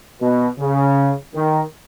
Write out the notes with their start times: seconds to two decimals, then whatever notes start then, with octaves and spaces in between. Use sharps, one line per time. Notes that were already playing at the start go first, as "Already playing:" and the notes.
0.21 B2
0.59 C#3
1.34 D#3